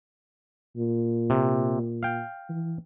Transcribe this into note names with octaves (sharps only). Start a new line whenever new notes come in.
A#2
C3
F5 G5
E3